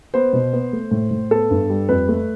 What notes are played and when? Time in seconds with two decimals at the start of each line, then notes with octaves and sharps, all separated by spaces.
0.14 B3 C5
0.33 B2
0.53 B3
0.73 A3
0.91 A2
1.11 A2
1.31 B3 A4
1.51 G2
1.70 G3
1.89 F2 B4
2.09 A3